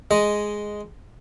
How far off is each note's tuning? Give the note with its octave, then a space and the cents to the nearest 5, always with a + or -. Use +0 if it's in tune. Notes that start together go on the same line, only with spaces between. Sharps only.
G#3 +0 D#5 +0